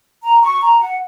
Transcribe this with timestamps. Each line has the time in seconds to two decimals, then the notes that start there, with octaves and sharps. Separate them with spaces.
0.23 A#5
0.43 C#6
0.61 A#5
0.79 F#5